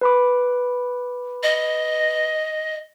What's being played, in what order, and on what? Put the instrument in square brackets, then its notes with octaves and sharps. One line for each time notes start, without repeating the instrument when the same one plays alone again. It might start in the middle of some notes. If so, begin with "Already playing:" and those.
[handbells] B4 B5 D6
[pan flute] D#5